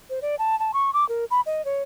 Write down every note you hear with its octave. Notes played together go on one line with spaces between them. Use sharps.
C5
D5
A5
A5
C#6
D6
A#4
B5
D#5
C#5